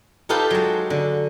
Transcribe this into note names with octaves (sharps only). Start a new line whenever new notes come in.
D#4 F4 G4 A4 B4 C5
F#3 G#3
D3